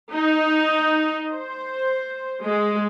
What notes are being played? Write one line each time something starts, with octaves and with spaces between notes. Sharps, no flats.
D#4
C5
G#3